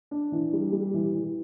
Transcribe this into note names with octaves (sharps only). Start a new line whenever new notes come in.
D4
E3
G3
G3
E3
E3